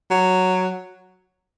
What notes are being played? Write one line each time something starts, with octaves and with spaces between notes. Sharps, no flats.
F#3